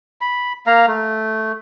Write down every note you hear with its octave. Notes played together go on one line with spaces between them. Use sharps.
B5
A#3 F5 A#5
A3